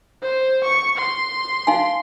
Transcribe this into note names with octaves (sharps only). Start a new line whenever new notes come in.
C5
C#6
C6
D#4 F5 G#5